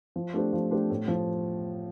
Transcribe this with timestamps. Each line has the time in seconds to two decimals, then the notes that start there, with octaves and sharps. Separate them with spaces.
0.16 F3
0.34 A3 D4 G4 C5
0.53 F3
0.71 A3 D4 G4 C5
0.90 A2
1.08 F3